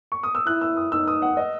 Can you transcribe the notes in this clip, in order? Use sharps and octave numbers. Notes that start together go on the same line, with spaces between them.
C#6
D#6
E6
E4 F#6
E6
D#6
D#4 E6
D#6
F#5
D#5